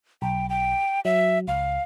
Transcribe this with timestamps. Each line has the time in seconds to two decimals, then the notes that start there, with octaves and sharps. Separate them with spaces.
0.22 B1 G5
0.50 G5
1.05 F#3 E5
1.48 C#2 F5